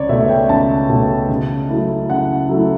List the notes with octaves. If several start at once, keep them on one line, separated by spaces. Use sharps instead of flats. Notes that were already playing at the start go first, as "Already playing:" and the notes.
Already playing: C#2 C#5 D5
B2 A3 E5
G5
C#2 A5
B2 A3
C#3
F#3 A3 E4
C#3 F#5
F#3 A3 E4